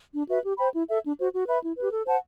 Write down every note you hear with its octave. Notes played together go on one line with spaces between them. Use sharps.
D4
F#4 B4 E5
G4
C5 G5 B5
E4
A4 E5
D4
F#4 C5
F#4
B4 E5 B5
E4
G4 B4
A4
C5 F#5 A5